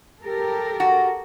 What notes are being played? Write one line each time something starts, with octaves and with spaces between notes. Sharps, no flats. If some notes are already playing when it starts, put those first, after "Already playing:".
G4 A4 A#4
F#4